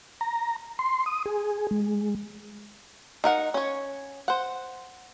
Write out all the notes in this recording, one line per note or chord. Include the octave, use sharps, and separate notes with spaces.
A#5
C6
D#6
G#4
G#3
D#4 A#4 F#5
C#4 C#5
C5 F#5